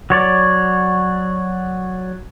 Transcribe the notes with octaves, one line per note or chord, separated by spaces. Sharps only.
F#3 C#5 D5